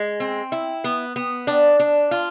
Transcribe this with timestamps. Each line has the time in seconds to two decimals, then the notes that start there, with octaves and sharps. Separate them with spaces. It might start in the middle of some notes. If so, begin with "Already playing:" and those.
Already playing: G#3
0.20 C4
0.52 E4
0.84 B3
1.16 B3
1.47 D4
1.80 D4
2.11 F4